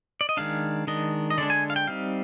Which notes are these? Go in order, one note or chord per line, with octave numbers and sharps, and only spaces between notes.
D5
D#5
D#3 G#3 D4 F5
D#3 G#3 D4 D#5
D#5
D3 G#3 D4 D5
G#5
F5
G5
G3 C4 D#4 F5